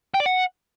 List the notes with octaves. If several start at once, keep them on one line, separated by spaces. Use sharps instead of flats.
G5
D5
F#5